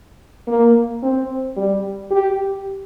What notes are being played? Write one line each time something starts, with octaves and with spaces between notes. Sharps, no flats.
A#3
C4
G3
G4